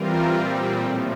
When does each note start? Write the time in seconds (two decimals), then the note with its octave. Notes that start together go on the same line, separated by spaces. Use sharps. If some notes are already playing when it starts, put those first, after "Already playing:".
Already playing: E3 G3 C4 F4 A#4
0.35 A#2 G3 C4
0.82 A2 F3